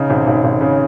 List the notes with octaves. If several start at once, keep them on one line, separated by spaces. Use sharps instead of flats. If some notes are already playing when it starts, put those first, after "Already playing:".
Already playing: C#3 D#4
G#1
G#1
G#1
C#3